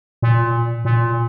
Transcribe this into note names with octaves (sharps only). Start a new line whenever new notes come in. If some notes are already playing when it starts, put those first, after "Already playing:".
A#2
A#2